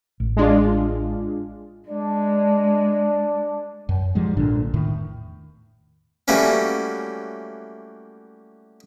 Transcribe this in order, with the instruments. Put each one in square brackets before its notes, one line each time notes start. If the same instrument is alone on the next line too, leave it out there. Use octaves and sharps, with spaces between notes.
[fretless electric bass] A1
[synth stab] G#3 D4 F4
[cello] G#3 [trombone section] D4
[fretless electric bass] F#2
G#2 F3 G3 G#3
A#1 A#2 D3 D4
E2 A2 D#3
[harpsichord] E3 F#3 G3 A3 A#3 C#4